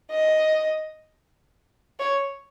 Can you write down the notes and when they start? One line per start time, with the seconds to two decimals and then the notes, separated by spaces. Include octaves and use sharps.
0.11 D#5
1.99 C#5